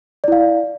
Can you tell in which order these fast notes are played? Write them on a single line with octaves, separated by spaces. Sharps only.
D5 E4 F5